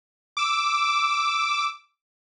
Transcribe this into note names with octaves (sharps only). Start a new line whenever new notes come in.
D6 E6